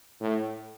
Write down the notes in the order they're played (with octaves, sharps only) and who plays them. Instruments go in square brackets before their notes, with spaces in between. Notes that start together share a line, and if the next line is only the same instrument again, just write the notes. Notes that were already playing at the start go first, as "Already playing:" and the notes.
[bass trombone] A2